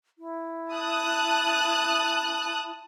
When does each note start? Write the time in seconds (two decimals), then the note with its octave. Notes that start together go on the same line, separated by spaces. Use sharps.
0.19 E4
0.73 A5 D#6 F#6